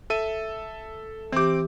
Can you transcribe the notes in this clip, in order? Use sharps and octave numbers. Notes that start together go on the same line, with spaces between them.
A4 E5 D#7
E3 C4 G4 D6